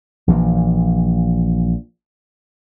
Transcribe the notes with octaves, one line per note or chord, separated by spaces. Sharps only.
A#1 E3 A#3